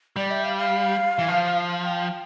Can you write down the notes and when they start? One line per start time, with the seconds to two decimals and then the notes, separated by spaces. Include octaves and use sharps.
0.16 G3 D5
0.31 E5
0.44 F5
0.58 F5
1.19 E3
1.28 F3
1.84 G5